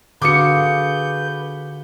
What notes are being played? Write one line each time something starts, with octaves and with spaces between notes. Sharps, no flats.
D3 F4 F#4 G#4 B4 D6 G6 C#7